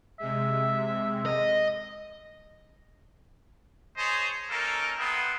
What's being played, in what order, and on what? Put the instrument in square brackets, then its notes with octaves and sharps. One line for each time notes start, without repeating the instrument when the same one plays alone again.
[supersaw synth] C3 G#3 [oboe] E5
[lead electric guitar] D#5
[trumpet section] G#4 C5 C#5 D#5 A5 C6
A#3 C#4 D#4 A4 A#4
B3 E4 A4 G5 C6 D#6